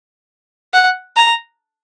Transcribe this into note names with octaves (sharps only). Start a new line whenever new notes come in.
F#5
A#5